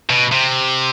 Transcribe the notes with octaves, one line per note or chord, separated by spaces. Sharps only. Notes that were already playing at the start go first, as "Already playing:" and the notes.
B2
C3